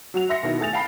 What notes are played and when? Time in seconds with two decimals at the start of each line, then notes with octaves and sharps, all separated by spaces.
0.14 F#3 F#4 F7
0.29 E5 C6 A#6 C#7
0.43 B2 D#3 E4
0.60 A3 G#4 A6 F7
0.73 F5 G5 A5 B5 C7